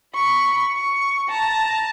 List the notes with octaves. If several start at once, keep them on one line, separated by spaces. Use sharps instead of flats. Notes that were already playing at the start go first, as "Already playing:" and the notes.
B5 C#6
C#6
A5 A#5